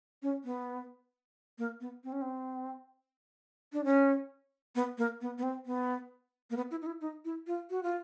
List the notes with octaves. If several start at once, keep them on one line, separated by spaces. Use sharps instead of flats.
C#4
B3
A#3
B3
C4
C#4
C4
D4
C#4
B3
A#3
B3
B3
C4
B3
A#3
B3
E4
D#4
E4
D#4
E4
F4
F#4
F4